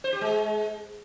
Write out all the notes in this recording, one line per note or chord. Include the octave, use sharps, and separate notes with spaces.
C5
G4
G#3